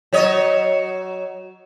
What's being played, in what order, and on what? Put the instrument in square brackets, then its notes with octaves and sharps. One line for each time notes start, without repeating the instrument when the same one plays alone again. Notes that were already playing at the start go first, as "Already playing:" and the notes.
[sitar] F#3 C#5 D#5